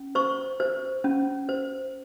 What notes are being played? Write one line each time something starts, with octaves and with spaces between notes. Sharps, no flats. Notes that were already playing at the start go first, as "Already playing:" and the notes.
Already playing: C#4
C5 C#6
C5
C#4
C5